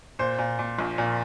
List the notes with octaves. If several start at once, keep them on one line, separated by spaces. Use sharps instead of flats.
A#2 C5
A#2
A#2
A#1
A#2